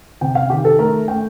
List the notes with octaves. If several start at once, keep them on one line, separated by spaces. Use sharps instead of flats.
C3 G5
F5
D#3 G4
A4
A3 A#4
A3 G5